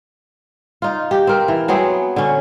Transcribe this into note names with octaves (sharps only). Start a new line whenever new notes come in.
D#4 F4
G4
C4 A#4
E3
F#3 B3 C4 G#4
D3 C#4